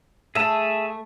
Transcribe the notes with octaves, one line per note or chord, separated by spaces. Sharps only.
A3 G#4 E5 A5